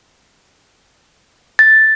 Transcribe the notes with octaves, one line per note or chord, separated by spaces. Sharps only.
A6